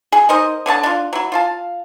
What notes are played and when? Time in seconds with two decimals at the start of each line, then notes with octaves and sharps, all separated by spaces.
0.12 G#4
0.29 D#4 A#4 C5 D#5
0.66 D3 C#5 D#5 A5
0.83 D4 F4
1.13 F#3 E4
1.32 F4 F5 A5